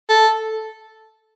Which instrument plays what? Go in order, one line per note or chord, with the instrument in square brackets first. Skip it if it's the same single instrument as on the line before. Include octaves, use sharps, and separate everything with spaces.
[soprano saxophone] A4